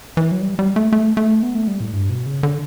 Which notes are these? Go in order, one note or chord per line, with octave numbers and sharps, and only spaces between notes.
E3
F#3
G3
G3
A3
A3
A3
B3
A3
G3
A2
G2
B2
C#3
D3